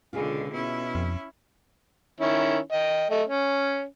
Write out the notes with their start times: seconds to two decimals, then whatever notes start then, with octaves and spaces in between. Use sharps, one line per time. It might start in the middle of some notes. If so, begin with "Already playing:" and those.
0.13 C#2 B2 D3 F4 G4 G#4
0.53 B2 C#4 E4
0.95 F2
2.21 D#3 C#4 E4
2.72 D#5 G5
3.10 A3 D#5
3.28 C#4